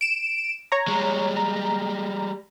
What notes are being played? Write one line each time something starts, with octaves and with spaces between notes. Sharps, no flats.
D7 E7
C#5 A#5
G3 G#3
A#5